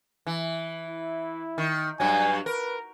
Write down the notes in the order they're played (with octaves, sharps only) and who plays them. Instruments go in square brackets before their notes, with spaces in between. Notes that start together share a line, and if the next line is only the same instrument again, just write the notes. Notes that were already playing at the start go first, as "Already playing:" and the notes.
[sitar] E3
[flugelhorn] E4
[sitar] D#3
[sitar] G2 F#3 [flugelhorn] G#5
[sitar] A#4 [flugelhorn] B4